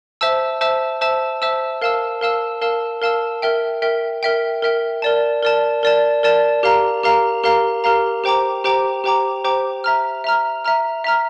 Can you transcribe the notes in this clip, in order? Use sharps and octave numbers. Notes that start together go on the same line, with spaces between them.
C5 E5 A5 E6
C5 E5 A5 E6
C5 E5 A5 E6
C5 E5 A5 E6
A#4 F5 A5 E6
A#4 F5 A5 E6
A#4 F5 A5 E6
A#4 F5 A5 E6
A#4 E5 G5
A#4 E5 G5
A#4 E5 G5
A#4 E5 G5
A#4 D5 A5
A#4 D5 A5
A#4 D5 A5
A#4 D5 A5
G4 A#4 F5 A#5
G4 A#4 F5 A#5
G4 A#4 F5 A#5
G4 A#4 F5 A#5
G4 C5 G5 A#5 D6
G4 C5 G5 A#5 D6
G4 C5 G5 A#5 D6
G4 C5 G5 A#5 D6
E5 A#5 F6
E5 A#5 F6
E5 A#5 F6
E5 A#5 F6